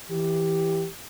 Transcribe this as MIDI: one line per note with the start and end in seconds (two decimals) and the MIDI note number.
0.10 0.86 52
0.10 0.86 67